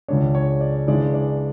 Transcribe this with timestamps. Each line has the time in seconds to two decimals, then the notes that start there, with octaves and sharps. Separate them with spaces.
0.08 C#2 C#3 G#3 D4 C#5
0.35 C#5
0.61 D5
0.87 C#3 E3 G#3 D4 D5
1.14 D5